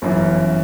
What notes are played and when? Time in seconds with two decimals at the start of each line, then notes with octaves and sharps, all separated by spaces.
0.02 G1 F#2 E3